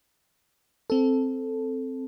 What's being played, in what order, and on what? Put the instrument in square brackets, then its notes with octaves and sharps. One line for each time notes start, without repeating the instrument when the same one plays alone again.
[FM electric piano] C4 A4